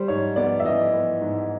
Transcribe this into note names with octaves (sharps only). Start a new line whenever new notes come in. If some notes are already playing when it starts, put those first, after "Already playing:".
Already playing: G3 C5
G#2 C#5
B3 D5
E5
E3 D#5
B3
G#2